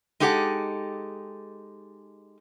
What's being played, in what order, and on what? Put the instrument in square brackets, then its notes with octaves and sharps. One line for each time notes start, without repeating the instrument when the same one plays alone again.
[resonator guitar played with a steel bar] G#3 D#4 G4 A4 A#4 F#5